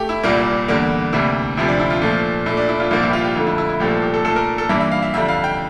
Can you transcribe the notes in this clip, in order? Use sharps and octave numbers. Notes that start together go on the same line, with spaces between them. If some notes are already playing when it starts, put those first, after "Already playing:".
Already playing: A3 G4
E4
C2 A#2 G3 A#3
E2 D3 G3 A#3
D2 C3 G3 A#3 E4
D2 C3 F3 E4
D4
E4
F4
A#2 F3 A3
A#2 A3 E4
D4
E4
F4
C2 A#2 F3 A#3 D4
E4
G4
F4
G4
F2 D3 A3 F4
E4
E4
E4
C2 A#2 F3 A3 G4
A4
G4
A4
A#2 A3 A4
A#4
A4
G2 E3 G3 A#3 E5
E5
F5
E5
F2 D3 G3 E5
F5
G5